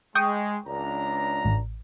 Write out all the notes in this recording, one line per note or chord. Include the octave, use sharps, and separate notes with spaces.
G#3 G5 C#6 D#6
C#2 D4 A#5
A1